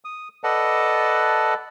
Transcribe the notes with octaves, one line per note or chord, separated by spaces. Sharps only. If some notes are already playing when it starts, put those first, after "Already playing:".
D#6
A4 B4 D5 D#5 F#5 A5